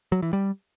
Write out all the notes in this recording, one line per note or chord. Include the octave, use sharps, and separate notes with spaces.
F#3
E3
G3